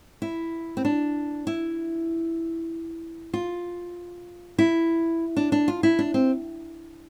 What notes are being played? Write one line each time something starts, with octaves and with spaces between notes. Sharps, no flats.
E4
C4
D4
E4
F4
E4
D4
D4
F4
E4
D4
C4